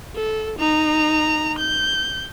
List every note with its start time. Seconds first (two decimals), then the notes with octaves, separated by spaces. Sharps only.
0.16 A4
0.59 D#4 A#5
1.58 G6